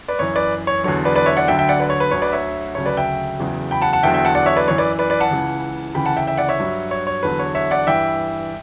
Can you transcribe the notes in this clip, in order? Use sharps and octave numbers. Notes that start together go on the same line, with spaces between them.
B4 D5
F#2 E3 C#5
B4 D5
C#5
E2 D3 F#3 C#5
B4 D5
B4 D5
C#5 E5
D5 F#5
D2 D3 F#3 E5 G5
E5 G5
D5 F#5
B4 D5
C#5
B4
D2 D3 F#3 C#5
B4 D5
C#5 E5
D2 C#3 F#3 C#5
B4 D5
E5 G5
E2 C#3 F#3
G5 B5
F#5 A5
F#5 A5
E2 D3 F#3 E5 G5
E5 G5
F#5 A5
D5 F#5
C#5 E5
B4 D5
F#2 E3 C#5
B4 D5
B4 D5
B4 D5
F#5 A5
C#2 C#3 E3
D2 C#3 E3 G5 B5
F#5 A5
E5 G5
E5 G5
D5 F#5
C#5 E5
G2 F#3
C#5
C#5
E2 D3 F#3 B4
C#5
C#5 E5
D5 F#5
G2 E3 E5 G5